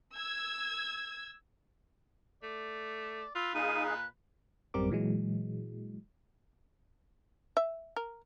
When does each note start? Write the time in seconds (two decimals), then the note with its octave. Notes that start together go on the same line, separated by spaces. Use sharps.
0.15 E6 G#6
2.43 A3 D5
3.35 F4 B4 E6
3.54 A#2 D#4 G#4 F5 D#7
3.87 F#6
4.74 A1 F#2 G3 C4 A#4 D6
4.90 A#2 E3 F#3 G#3
7.57 E5
7.96 A#4